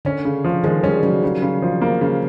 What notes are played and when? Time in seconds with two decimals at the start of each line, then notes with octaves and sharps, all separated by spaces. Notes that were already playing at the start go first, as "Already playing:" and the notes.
0.05 D3 C#4
0.25 C#3
0.44 F3
0.64 D#3 G#3
0.84 G3 C#4
1.03 C#3 F#3
1.23 C#3
1.42 C#3
1.62 F3
1.82 A#3
2.01 C#3